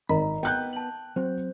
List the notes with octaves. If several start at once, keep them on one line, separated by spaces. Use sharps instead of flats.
G#1 A#4 D#5 A#5 B5
B3 G5 F#6 G6
A5 F#7
F#3 C4 C5